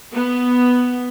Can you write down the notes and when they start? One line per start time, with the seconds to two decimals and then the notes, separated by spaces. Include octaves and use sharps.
0.13 B3